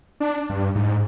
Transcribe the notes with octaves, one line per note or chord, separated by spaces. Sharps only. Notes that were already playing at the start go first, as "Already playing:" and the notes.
D4
G2
G#2